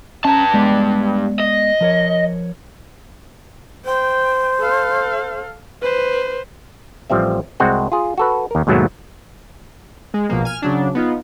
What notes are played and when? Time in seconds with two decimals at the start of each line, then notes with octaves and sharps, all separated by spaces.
0.25 G2 C#4 A5 A#5
0.54 G#3 B3 D5
1.40 D#5
1.81 F3 A#4 C#5
3.85 C5 G5
4.60 A4 F5
5.82 B4 C5
7.10 A1 F3 G3 C4 E5
7.60 C2 G#3 C4 F#4 C5 F#5
7.92 F4 G#4
8.18 F#4 A4 B4
8.51 D#2 A#4
8.67 D#2 G#2 B2 F#3 A3 A#3
10.14 G#3
10.29 A#1 B2 F3 A#3
10.45 G#5 F6
10.62 C#3 F#3 D4
10.95 B3 D#4 F4